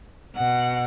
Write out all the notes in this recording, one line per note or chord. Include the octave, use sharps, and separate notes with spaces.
B2 F#5